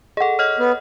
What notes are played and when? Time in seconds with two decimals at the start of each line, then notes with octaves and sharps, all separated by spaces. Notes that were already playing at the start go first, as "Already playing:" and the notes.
0.17 G#4 A4 D#5 F#5
0.39 C#5 D#5 F#5 F6
0.59 B3